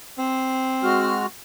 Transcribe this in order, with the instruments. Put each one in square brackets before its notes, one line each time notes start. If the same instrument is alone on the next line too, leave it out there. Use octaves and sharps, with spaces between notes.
[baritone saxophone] C4
[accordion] G#3 F#4 F6